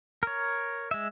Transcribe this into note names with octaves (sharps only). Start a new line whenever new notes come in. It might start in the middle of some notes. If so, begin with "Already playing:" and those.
A#4 C#5
G#3 E5